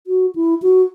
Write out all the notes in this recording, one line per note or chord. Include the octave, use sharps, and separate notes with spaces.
F#4
E4
F#4